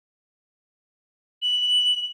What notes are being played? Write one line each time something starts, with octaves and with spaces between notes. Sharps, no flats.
F#7